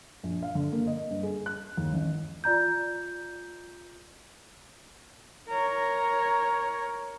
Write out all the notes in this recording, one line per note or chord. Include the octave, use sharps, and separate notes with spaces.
A#1
F5
D3
A#3
D#5
G2
G#4
F#6
D#2
A1
F4 D5 A#5 G6
A#4 C#5